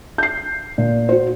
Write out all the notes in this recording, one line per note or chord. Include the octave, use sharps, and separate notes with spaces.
G6 C7
A#2
F#4 C5